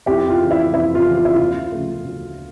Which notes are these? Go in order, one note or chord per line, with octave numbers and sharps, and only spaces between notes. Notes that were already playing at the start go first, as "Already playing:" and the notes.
F2 E4 G4
F4
C#3 E3
E4
F2 E4
F4
C#3 E3
F4
E4
F4
D2
C#3 F3 A3
D2